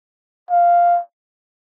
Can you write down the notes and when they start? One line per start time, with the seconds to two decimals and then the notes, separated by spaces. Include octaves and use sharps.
0.51 F5